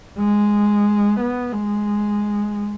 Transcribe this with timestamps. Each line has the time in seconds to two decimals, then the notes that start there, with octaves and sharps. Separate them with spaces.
0.19 G#3
1.20 B3
1.52 G#3